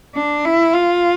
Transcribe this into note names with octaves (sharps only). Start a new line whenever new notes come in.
D4
E4
F4